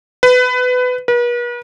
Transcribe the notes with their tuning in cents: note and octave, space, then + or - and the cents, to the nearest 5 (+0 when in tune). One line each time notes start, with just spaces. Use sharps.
B4 +20
B4 -45